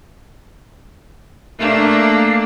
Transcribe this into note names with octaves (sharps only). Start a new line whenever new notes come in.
A3 A#3 D4